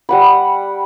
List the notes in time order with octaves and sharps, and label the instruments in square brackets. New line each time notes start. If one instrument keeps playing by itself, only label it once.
[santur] G3 F#5 B5